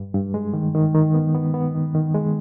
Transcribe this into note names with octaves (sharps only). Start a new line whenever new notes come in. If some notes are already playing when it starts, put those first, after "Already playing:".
Already playing: G2
G2
G#3
D#3
D#3
D#3
B3
B3
B3
D#3
D#3
G#3